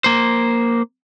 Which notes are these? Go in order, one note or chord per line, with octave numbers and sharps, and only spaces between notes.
A#3 C5